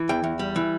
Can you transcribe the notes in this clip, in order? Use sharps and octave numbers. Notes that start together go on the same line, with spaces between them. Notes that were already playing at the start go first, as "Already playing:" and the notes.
Already playing: E3
E2 G5
E2
G3
E3